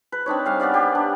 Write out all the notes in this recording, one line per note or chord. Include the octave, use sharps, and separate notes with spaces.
B4
C4 D4 D#4 C#5
G3 F5 G#5
B3 G4 D5 F5
G4
D4